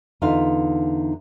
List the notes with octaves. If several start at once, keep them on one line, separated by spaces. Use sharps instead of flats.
E2 D3 D#4 F4 E5 F5